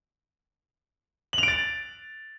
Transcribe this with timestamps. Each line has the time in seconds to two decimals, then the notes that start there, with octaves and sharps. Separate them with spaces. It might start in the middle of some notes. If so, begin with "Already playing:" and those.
1.33 F#7
1.38 F7
1.43 D7
1.48 A6